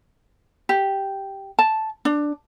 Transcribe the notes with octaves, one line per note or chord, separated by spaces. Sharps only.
G4
A5
D4